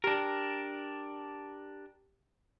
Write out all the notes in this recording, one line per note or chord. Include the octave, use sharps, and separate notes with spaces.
D4 G4 A#4